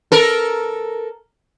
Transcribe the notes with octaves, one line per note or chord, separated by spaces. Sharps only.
A4 A#4